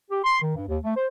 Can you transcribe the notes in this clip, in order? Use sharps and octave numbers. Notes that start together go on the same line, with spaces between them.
G4
C6
D#3
G2
D#2
A3
C5